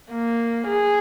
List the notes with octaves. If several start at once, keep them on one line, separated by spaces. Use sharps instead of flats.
A#3
G#4